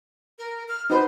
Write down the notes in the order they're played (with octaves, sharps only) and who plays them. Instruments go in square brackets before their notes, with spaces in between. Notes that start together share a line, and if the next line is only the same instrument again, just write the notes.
[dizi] A#4
F6
[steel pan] D#4 F#4 B4 [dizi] C5